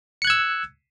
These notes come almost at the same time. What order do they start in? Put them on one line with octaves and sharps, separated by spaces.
C#7 F#6 G#6 E6